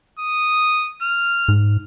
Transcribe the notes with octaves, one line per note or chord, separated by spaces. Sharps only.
D#6
F6
G#2